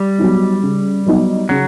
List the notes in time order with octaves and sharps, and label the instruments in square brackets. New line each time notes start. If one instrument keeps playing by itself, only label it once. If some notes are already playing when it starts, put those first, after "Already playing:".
Already playing: [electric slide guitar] G3
[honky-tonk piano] F#3 B3 D#4
C#3
F#3 B3 D#4
[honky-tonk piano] C#3 [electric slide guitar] F#3